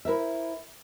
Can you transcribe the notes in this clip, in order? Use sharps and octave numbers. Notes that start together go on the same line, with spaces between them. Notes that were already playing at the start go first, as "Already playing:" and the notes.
E4 A#4 C5 E5